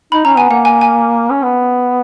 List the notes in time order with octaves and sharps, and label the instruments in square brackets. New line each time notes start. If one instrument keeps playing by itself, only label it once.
[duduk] D#4 [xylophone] B5
[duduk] C#4 [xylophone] A#5
[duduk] B3 [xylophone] G#5
[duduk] A#3 [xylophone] F#5
[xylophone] G#5
G#5
[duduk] C#4
B3